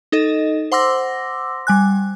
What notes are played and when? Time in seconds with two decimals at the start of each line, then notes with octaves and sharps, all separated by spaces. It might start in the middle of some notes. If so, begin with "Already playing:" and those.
0.12 D#4 A4 D#5
0.72 C5 F#5 C6 D6 E6 A#6
1.67 G3 G#5 F#6